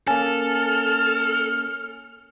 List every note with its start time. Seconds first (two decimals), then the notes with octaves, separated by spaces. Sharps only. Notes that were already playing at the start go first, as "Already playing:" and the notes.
0.08 A#3 C#4 A4 G#5 F6